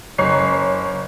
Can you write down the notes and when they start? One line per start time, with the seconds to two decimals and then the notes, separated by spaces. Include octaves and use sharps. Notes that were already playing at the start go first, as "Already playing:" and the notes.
0.18 F#1 C#5 A#5 C7